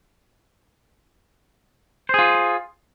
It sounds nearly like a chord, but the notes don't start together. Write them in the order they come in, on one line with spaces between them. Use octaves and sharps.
C5 G#4 F4